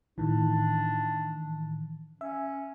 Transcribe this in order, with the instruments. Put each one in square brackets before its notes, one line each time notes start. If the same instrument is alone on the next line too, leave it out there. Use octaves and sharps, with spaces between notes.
[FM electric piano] A2 D#3 E3 [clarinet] D4
[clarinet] C#4 [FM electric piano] E5